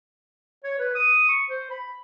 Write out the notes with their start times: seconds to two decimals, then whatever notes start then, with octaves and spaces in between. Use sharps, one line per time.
0.64 C#5
0.79 B4
0.95 D#6
1.29 C#6
1.50 C5
1.70 B5